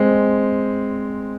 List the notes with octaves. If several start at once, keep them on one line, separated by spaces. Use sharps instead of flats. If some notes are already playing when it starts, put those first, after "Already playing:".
Already playing: G#3 C4